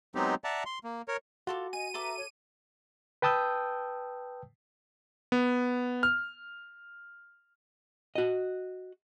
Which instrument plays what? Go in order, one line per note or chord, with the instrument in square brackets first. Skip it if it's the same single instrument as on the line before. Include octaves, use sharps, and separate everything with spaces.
[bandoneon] F#3 G#3 B3 C4 D#4 G4
D5 E5 F#5 A5 A#5
C6
A#3
A#4 C#5
[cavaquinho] F4 A4 D6 [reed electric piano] F#4
[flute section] D#5 [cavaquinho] G#5 [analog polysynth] D#7
[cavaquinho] A4 D6 [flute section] B4 E5 A#5
[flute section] C#5
[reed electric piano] B4 G5 A5 D#6 E6 G6
[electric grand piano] B3
F6
[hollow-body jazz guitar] F#4 D#5